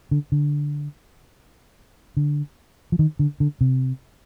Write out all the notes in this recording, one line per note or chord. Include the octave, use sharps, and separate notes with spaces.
D3
D3
D3
F3
D#3
D3
D3
C3